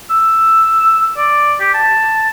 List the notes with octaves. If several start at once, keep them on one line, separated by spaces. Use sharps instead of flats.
E6
D5
G4
A5